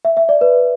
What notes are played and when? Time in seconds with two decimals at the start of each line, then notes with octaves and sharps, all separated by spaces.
0.05 E5
0.17 E5
0.29 D5
0.41 B4